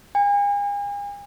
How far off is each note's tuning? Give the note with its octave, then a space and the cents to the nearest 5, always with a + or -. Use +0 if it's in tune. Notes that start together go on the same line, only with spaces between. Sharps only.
G#5 -40